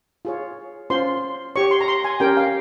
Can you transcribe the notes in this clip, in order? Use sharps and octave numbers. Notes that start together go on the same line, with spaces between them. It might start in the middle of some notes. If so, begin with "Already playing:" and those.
F4 G#4 C#5
C#4 F4 C5 C6
G4 C#5 C#6
C6
A#5
C6
G#5
C#4 G4 A#4 G5
F5